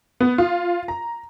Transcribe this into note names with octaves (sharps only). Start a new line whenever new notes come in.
B3
F4
A#5